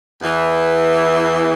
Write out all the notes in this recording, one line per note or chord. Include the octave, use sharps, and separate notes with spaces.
E2 E3